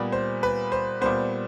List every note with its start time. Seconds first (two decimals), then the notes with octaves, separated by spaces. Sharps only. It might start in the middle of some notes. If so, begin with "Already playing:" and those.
Already playing: A#2 G3 B3
0.12 C5
0.43 B4
0.72 C5
1.01 A#2 G3 B3 C5